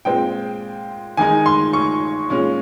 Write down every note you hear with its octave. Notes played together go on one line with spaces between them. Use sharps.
A#2 G#3 C4 G5
D#3 G#3 D#4 G#5
C6
C#6
A#2 G#3 C#4